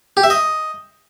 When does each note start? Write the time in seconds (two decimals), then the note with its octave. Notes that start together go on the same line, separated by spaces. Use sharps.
0.17 G4
0.24 E5
0.30 D#5